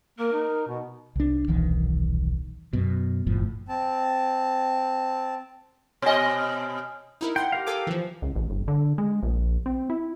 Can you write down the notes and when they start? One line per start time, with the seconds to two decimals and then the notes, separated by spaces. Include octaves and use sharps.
0.19 A#3 A#4
0.32 D#4
0.67 B2
1.16 C2 D4
1.48 D#1 B1 D#3 E3
2.73 F#2 B2
3.27 F#1 F2 A2 F3
3.69 C4 A5
6.02 B2 C#5 D#5 G#5
7.21 D#4 E4 A#4
7.36 F#5 G5 C6
7.52 G4 A#4 F5
7.67 A4 G#5 D6
7.87 E3 F3
8.22 C#2
8.36 A1
8.50 G1
8.68 D3
8.98 G#3
9.23 A#1
9.66 C4
9.90 E4